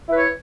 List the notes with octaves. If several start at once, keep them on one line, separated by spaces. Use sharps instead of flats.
E4 B4 C#5